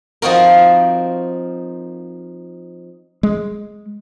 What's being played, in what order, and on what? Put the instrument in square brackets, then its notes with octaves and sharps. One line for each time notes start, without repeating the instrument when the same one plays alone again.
[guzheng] F3 C4 D#4 F#4 A#4
[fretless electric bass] G#3